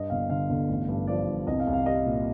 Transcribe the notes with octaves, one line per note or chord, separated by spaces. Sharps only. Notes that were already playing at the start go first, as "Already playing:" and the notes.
Already playing: G2 D#5
G1 F5
D3 F5
G1
A1
G2
F3 D5
G2
C2 D#5
F5
C2
F5
G3 D#5
A#2